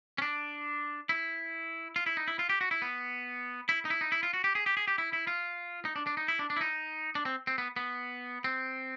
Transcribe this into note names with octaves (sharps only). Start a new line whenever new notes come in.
C#4
D4
E4
F4
E4
D#4
E4
F4
G4
F#4
E4
B3
E4
D#4
E4
D#4
E4
F4
F#4
G4
G#4
G4
G#4
G4
E4
E4
F4
D#4
D4
D4
D#4
E4
D4
D4
E4
D#4
D4
C4
C4
B3
B3
C4